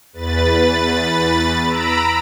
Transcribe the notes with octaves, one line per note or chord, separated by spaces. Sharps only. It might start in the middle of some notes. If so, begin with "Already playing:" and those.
E2 B4 A6
A#5 B5 E6 D7